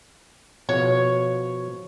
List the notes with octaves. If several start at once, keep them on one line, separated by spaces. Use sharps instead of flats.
B2 F3 C#5 F#5